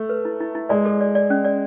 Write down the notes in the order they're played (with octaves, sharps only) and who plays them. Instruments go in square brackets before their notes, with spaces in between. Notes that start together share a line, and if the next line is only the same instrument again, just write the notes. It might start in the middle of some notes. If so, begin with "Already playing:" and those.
Already playing: [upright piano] A3
[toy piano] B4
E4
E4
E4
[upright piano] G#3 [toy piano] D5
[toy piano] A4
D5
D5
C#4
D5